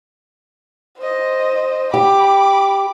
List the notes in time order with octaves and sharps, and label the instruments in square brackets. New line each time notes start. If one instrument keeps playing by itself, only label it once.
[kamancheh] C5 D#5
[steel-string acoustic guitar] G4 [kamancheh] B5 D6